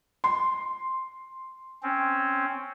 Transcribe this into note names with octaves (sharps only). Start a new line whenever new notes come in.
C6
C4 C#4